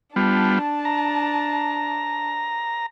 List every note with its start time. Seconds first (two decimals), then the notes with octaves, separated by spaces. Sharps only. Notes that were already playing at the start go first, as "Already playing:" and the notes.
0.16 G3 B3 D4 F4 A5
0.85 A#5